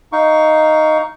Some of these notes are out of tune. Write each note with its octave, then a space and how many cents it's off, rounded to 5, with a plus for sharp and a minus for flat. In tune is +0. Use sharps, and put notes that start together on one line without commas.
D#4 +0 F5 +0 C#6 +15